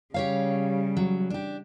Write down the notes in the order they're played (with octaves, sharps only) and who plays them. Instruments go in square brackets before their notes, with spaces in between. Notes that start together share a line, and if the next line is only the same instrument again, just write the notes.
[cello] C#3 G3 [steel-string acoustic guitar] G4 C#5 F5
[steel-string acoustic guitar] F#3
D4 G4